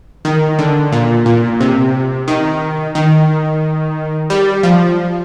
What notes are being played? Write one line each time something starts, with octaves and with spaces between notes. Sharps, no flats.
D#3
D3
A#2
A#2
C3
D#3
D#3
G3
F3